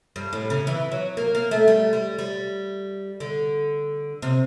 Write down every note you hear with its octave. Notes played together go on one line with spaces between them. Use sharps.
G2
A2
C#3
E3
F#3
A#3
A#3
A3
G3
G3
G3
D3
C3